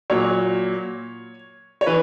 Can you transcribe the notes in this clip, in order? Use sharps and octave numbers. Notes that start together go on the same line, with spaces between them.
A#2 F#3 C#5
C#5
E3 B4